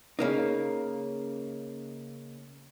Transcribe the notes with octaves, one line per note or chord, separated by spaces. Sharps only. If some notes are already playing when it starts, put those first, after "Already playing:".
C#3 A#3 D#4